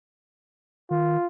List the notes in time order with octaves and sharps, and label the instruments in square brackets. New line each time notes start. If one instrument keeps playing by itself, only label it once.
[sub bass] D#3 [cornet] F4